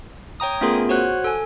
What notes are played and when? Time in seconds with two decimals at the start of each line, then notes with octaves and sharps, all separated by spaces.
0.40 C#5 G5 A#5 D#6
0.61 A3 B3 C#4 F4 G#4 A#4
0.89 F#4 C5 C#5 F#5 F#6
1.24 A4 G#5